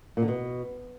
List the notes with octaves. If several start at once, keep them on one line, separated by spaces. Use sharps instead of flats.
A#2
D3
B2